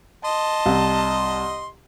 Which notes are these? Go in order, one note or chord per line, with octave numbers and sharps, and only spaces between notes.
D#5 A5 C6
C2